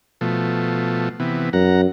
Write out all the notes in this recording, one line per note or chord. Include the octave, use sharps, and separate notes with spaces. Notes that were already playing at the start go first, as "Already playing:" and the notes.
B2 F3 A3
C3 E3 B3
F#2 F#5 A#5